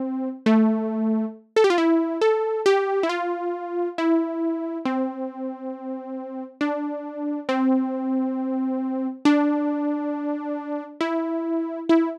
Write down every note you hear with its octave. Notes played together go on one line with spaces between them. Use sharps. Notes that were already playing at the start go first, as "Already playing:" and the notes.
Already playing: C4
A3
A4
G4
F4
E4
A4
G4
E4
F4
E4
C4
D4
C4
D4
E4
E4